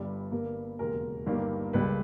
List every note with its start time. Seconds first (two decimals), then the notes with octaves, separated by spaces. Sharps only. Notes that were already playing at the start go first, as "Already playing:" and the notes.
Already playing: G1 G2 G3
0.31 G1 G2 G3 A#3 A#4
0.79 E1 D#2 C#3 G#3 A#4
1.26 G1 G2 D#3 G3 A#3
1.73 C#2 C#3 G3 A#3 B4